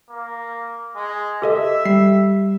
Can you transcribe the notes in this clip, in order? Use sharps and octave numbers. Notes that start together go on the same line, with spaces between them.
A#3
G#3
G4 A4 D#5 E5
G3 C7